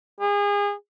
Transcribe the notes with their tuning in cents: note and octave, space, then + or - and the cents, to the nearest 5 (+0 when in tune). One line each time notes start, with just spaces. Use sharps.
G#4 -30